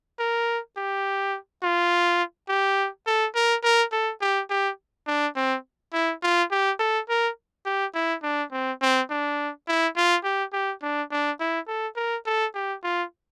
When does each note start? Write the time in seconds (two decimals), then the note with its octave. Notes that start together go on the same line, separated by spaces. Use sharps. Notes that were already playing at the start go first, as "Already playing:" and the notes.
0.19 A#4
0.77 G4
1.63 F4
2.49 G4
3.07 A4
3.35 A#4
3.64 A#4
3.92 A4
4.21 G4
4.50 G4
5.07 D4
5.36 C4
5.93 E4
6.23 F4
6.51 G4
6.80 A4
7.09 A#4
7.66 G4
7.95 E4
8.23 D4
8.52 C4
8.82 C4
9.10 D4
9.68 E4
9.96 F4
10.24 G4
10.53 G4
10.82 D4
11.11 D4
11.40 E4
11.68 A4
11.96 A#4
12.26 A4
12.55 G4
12.83 F4